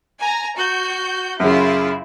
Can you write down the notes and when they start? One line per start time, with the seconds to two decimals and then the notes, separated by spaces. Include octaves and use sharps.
0.19 G#5 A#5
0.56 F#4 G6
1.40 F#2 C#3 E4 F4